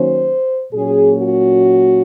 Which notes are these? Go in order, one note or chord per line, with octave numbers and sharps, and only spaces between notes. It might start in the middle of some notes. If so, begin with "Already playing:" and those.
Already playing: D#3 F#3 A#3 C#4 C5
A#2 F#3 A#3 C#4 G#4
F#4